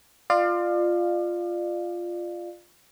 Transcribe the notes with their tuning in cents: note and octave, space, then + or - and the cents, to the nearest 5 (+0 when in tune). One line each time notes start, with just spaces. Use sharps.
F4 +0 D5 +35 F5 +0